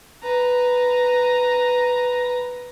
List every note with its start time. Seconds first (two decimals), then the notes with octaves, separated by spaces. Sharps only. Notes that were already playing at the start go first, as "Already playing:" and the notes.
0.23 B4 A#5